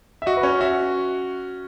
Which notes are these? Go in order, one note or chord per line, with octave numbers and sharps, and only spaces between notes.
E5
F#4 D#5
B4
C#4 C#5
F#4 E5